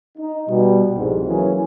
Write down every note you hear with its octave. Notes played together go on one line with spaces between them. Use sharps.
D#4
B2 G3
C2 F2 G#2
E3 F#3 A#3 C#4 E4 G#4